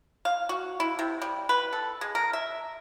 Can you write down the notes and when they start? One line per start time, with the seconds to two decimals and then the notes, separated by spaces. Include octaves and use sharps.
0.25 F5
0.49 F#4
0.80 E4
0.99 C3
1.22 G3
1.49 B4
1.73 A4
2.01 G#3
2.15 A#4
2.33 E5